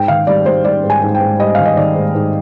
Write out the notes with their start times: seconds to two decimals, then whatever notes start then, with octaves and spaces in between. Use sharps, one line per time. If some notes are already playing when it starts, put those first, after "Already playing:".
Already playing: G#2 G5
0.08 D#3 F5
0.27 G3 D5
0.46 G3 C5
0.64 G3 D5
0.84 G#2
0.90 G#5
1.02 G#2
1.15 G5
1.21 G#2
1.39 G3 D#5
1.55 D#3 F5
1.66 D#5
1.77 D#3 D5
1.95 G#2
2.14 G#2